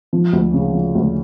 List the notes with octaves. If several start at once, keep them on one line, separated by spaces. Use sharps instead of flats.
F3
D2
C#3
F3
D2